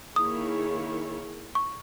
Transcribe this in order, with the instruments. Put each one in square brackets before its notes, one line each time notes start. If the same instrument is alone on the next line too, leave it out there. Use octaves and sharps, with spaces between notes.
[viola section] D#3 A#3 E4 G#4 C#5 [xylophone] D#6
[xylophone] C#6